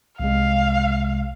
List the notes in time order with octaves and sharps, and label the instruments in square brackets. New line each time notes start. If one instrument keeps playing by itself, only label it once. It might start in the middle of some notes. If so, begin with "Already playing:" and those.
[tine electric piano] C2 C3 G#3 [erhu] F5